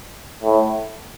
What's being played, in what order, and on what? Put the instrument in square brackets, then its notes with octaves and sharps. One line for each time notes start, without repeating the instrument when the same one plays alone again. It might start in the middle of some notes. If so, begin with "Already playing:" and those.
[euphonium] A2